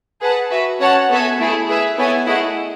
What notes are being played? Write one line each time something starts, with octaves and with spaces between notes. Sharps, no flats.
G#4 B4 F#5 A5
F#4 B4 E5
C#4 F#4 C#5 F#5 A5
B3 F#4 A4 E5 G#5
A3 E4 G#4
G#4 B4 E5
B3 E4 A4 C#5 G#5
A3 E4 G#4 D#5 F#5